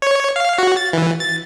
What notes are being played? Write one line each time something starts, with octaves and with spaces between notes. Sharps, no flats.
C#5
F5
F#4
A6
E3
A6